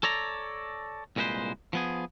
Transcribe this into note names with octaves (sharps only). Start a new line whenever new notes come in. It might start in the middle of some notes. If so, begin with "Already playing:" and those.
A4 C#5 D5 A#5
C2 A#2 G#3 B4 C5
F3 B3 G#4